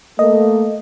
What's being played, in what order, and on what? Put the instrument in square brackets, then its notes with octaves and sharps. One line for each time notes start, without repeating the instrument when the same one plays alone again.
[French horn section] A3 A#3 [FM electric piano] D#5